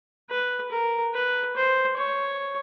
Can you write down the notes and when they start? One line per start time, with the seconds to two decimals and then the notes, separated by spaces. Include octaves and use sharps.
0.30 B4
0.71 A#4
1.14 B4
1.56 C5
1.97 C#5